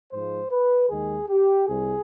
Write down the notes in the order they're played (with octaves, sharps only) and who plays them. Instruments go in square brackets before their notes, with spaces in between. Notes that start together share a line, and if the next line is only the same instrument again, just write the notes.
[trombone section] G#2 F3 G#3 C5
B4
D#2 D#3 G#3 G#4
G4
C2 C3 G3 G#4